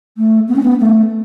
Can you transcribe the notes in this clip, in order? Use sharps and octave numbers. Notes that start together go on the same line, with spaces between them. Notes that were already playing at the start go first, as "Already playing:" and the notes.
A3
B3
C#4
B3
A3